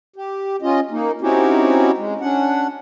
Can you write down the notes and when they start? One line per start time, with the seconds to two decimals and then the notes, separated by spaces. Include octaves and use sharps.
0.16 G4
0.62 C#4 F4 D#5
0.91 A#3 D#4
1.21 C4 C#4 D#4 E4 F#4 G4
1.97 G#3
2.21 C#4 D4 F#5